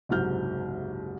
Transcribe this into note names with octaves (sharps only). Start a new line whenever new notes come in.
F#1 C2 G#2 F#3 F6 G6